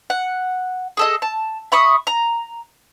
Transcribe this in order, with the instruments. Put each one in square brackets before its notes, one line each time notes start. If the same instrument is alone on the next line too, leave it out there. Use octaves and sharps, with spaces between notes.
[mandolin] F#5
G#4 A4 D#5
A5
E5 B5 C#6 D#6
A#5